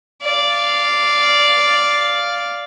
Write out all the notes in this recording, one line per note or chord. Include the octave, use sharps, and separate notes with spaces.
D5 F5